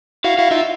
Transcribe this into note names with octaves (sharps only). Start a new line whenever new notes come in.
E4 F#4 F5
E4 F#4 F5
D#4 F4 E5